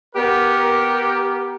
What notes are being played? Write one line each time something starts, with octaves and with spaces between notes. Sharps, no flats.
B3 G4 A#4